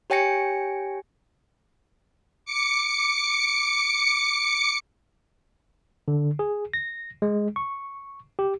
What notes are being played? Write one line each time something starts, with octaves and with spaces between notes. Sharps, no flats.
G4 C#5 G5 G#5 A#6 C#7
D6 C#7
D3
G#4
A#6
G#3
C#6
G4